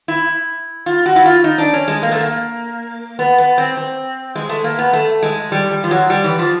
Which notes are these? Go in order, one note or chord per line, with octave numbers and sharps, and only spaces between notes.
E4
F4
F#4
E4
F4
D#4
D4
C#4
G#3
A#3
A3
A#3
B3
B3
C4
C4
G#3
A3
A#3
B3
A3
G#3
G3
G3
F3
F#3
G3
E3
F3